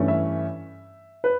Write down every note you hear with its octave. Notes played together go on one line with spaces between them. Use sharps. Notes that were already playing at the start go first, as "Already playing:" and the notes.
Already playing: G2 E3 A3 C#4
E5
B4